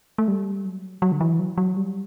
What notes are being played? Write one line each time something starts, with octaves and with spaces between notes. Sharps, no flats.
A3
G3
F#3
F#3
D3
E3
F#3
F#3
G3